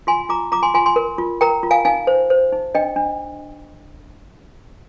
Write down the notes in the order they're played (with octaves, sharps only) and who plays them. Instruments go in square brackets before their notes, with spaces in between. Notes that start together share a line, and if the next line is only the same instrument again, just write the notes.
[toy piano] F4 G#5 C6
F4 A#5 D6
F4 A#5 D6
G#5 C6
F4 G#5 C6
G#5 C6
A#4
F4
A#4 G5 A#5
F4
F5 G#5
D#4 F5 G#5
C5
C5
D#4
D4 D#5 G5
D4